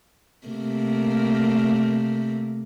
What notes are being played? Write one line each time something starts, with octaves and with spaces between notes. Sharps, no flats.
C3 A3 A#3